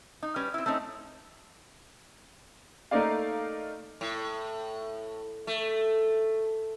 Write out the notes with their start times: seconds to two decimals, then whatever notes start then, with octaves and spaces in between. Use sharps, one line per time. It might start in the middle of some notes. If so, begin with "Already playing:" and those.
0.23 D#4
0.36 G3 C#4 B4
0.54 C4 E4
0.66 A3 C4 C#4 D#4
2.91 A3 A#3 D#4 A#4 D5 F5
4.01 A2
5.47 A3